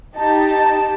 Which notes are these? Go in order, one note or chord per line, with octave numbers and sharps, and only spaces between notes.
D#4 G4 A5
A5